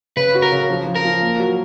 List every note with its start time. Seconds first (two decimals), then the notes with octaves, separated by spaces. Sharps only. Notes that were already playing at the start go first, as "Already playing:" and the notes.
0.16 C#3 B4
0.35 F#4
0.42 A#4
0.52 C#3
0.70 F3
0.87 F3
0.95 A#4
1.05 F3
1.22 A#3
1.39 F#3